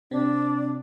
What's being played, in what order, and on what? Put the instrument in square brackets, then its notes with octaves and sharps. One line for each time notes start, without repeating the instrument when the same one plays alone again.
[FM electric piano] C3 C4 [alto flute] D4